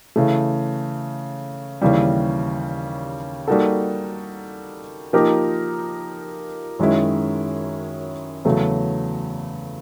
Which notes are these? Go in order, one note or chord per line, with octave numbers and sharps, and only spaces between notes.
C#3 E3 A3
D#2 C#3 E3 G3
G3 A#3 D#4 F#4 A4
F3 A#3 D#4 G4 A#4
F#2 D#3 G#3 C#4 E4
E2 C#3 F#3 A3